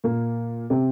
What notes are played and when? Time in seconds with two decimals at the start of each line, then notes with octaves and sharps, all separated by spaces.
0.04 A#2 A#3
0.70 C3 C4